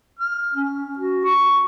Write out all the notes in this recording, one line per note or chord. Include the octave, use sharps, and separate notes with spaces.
F6
C#4
F#4
C#6